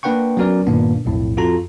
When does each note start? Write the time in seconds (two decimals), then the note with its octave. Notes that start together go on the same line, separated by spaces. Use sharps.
0.03 A#3 D4 B4 F#5 G5 C#6
0.37 F#3 B3 C#4 F#4 A#4 D5
0.67 G2 A#2 D#3 A#3 B3 D4
1.05 B1 F2 A2
1.37 F2 F4 F#4 A4 A#5